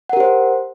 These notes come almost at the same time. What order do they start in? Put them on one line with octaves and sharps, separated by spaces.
F#5 A#4 G4 C5